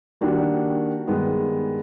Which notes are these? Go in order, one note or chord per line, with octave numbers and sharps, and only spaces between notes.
D#3 G3 A#3 D4 F#4
G2 D#3 G#3 B3